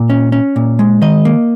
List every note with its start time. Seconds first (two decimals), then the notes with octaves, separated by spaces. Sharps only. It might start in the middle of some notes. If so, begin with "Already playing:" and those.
Already playing: A#2
0.10 C#4
0.32 C#4
0.56 A#2
0.79 G#3
1.02 D#3 D#5
1.25 A#3